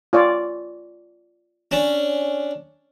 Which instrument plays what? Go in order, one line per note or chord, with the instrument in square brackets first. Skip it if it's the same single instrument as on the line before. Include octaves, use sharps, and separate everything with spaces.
[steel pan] F4 C#5 D5
[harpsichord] C#4 D4